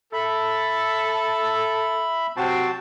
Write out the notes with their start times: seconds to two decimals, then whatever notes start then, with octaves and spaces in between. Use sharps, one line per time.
0.13 A4 E5 B5
2.37 C3 F#3 C4 F#4 A5